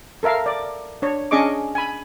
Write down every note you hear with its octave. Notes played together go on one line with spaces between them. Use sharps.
A4 A#4 E5 F5
D5
D4 C#5
C#4 D4 G#4 D#5 C#6 D6
G#5 B5